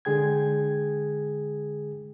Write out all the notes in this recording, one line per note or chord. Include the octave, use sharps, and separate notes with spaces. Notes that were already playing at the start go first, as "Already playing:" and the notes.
D3 G#3 G#4 G5 G#6